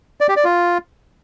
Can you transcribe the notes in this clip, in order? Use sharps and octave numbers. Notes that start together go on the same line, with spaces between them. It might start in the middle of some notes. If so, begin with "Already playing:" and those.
D5
G4
D5
F4